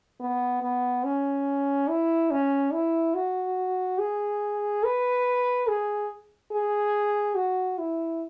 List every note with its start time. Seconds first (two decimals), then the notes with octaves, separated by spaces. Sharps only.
0.20 B3
0.62 B3
1.04 C#4
1.89 E4
2.30 C#4
2.73 E4
3.14 F#4
3.99 G#4
4.84 B4
5.67 G#4
6.52 G#4
7.35 F#4
7.78 E4